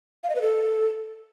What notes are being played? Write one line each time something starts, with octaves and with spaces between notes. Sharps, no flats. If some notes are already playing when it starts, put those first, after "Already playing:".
F5
D#5
B4
A4